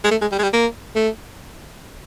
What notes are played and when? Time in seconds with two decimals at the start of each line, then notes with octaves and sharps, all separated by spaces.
0.04 G#3
0.11 A3
0.21 G#3
0.32 G3
0.39 G#3
0.43 G3
0.54 A#3
0.96 A3